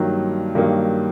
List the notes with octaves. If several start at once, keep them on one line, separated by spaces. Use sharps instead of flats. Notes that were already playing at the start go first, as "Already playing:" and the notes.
Already playing: G2 D#3 F#3 A#3
G2 D#3 F#3 A#3